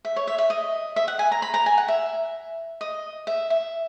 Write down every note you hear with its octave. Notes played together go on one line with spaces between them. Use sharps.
E5
C#5
E5
E5
D#5
E5
F#5
G#5
A#5
B5
A#5
G#5
F#5
E5
D#5
E5
E5